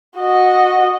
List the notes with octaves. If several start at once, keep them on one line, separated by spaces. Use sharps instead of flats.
F#4 D#5